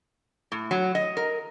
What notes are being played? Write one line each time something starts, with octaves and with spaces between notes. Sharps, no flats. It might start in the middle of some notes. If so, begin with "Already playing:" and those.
A2
F#3
D#5
A#4